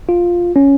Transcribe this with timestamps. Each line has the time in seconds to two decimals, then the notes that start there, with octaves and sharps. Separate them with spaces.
0.09 F4
0.56 C#4